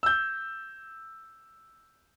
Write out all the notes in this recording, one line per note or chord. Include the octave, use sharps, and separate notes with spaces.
E6 G6